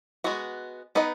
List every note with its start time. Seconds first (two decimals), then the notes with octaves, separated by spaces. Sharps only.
0.24 G#3 B3 F#4
0.95 B3 D#4 B4 D#5